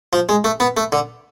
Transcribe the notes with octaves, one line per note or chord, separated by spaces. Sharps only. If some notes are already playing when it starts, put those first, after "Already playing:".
F3
G#3
A3
B3
A3
D3